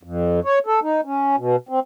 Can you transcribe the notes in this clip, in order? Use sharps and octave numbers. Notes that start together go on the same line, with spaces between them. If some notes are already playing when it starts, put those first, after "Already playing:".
F2
C#5
A4
D#4
C#4
B2
C4